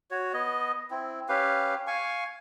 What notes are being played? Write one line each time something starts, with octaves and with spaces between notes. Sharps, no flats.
F#4 C#5
B3 D#5
C4 E4
C#4 G4 B4 F5
F5 G#5 C#6